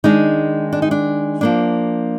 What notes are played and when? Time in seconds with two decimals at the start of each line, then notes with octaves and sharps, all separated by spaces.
0.04 D#3 G#3 D4 D#4
0.73 D4
0.82 D#4
0.91 D4
1.41 F3 A#3 D4